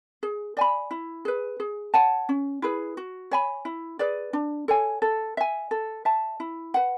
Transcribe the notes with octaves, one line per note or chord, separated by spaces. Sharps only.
G#4
D5 G#5 B5
E4
G#4 B4
G#4
C#5 F#5 A5
C#4
E4 G#4 B4
F#4
C#5 G#5 B5
E4
G#4 B4 D5
D4
A4 C#5 G#5
A4
E5 G#5
A4
E5 A5
E4
B4 F#5